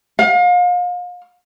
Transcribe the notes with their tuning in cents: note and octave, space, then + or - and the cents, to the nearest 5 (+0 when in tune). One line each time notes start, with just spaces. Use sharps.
F5 +35